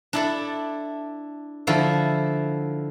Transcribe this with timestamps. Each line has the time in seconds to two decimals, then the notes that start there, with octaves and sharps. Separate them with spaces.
0.13 D4 E4 A4
1.67 D3 F3 E4